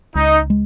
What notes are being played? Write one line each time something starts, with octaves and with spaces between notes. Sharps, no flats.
C#2 D#4
G#3